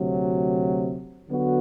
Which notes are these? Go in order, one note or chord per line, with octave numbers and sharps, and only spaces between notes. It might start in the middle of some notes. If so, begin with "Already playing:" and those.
Already playing: D2 C3 F#3
D3 F#3 B3 F#4